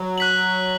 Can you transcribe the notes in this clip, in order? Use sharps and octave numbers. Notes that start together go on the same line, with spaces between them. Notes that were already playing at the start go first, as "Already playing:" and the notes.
Already playing: F#3
F#6 B6 F#7